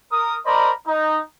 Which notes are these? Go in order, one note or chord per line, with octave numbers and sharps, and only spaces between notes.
A#4 D#6
A#4 C5 D5 D#5 A#5 B5
D#4